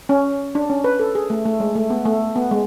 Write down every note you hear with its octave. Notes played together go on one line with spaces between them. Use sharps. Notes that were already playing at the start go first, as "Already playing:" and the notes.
C#4
D4
C#4
B4
A4
G#4
A3
A3
G#3
A3
B3
A3
B3
G#3